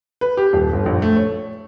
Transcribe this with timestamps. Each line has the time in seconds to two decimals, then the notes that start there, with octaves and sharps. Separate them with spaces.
0.21 B4
0.37 G4
0.53 D#1
0.73 G1
0.86 A#1
1.02 A3
1.16 C#5